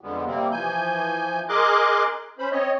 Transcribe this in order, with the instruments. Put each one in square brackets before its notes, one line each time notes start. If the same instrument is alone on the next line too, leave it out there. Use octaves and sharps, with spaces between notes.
[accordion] F2 D3 G3 G#3 B3
C3 G3 A#3 C4
E3 F3 G#5 G6
G#4 A#4 D#5 C6 D6 F#6
C#4 C5 B5
C4 C#5 D#5